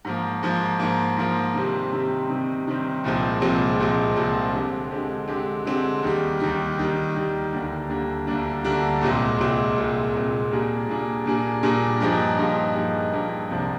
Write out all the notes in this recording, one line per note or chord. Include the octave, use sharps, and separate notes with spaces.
G#2 F3 A#3
G#2 F3 A#3
G#2 F3 A#3
G#2 F3 A#3
C3 D#3 G3 C4
C3 D#3 G3 C4
C3 D#3 G3 C4
C3 D#3 G3 C4
C2 A#2 F3 G#3 C4
C2 A#2 F3 G#3 C4
C2 A#2 F3 G#3 C4
C2 A#2 F3 G#3 C4
D3 G#3 C4 G4
D3 G#3 C4 G4
D3 G#3 C4 G4
D3 G#3 C4 G4
D#2 D#3 G3
D#2 D#3 G3
D#2 D#3 G3
D#2 D#3 G3
D2 D3 G3 A#3 D4
D2 D3 G3 A#3 D4
D2 D3 G3 A#3 D4
D2 D3 G3 A#3 D4
C2 A#2 G#3 C4
C2 A#2 G#3 C4
C2 A#2 G#3 C4
C2 A#2 G#3 C4
A#2 G3 A#3 D4 G#4
A#2 G3 A#3 D4 G#4
A#2 G3 A#3 D4 G#4
A#2 G3 A#3 D4 G#4
G2 F3 A#3 D#4 G#4
G2 F3 A#3 D#4 G#4
G2 F3 A#3 D#4 G#4
G2 F3 A#3 D#4 G#4
C2 C3 F3 A#3 D4